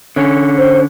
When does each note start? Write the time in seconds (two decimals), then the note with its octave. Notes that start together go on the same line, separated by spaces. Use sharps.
0.16 D3 C#4
0.58 C5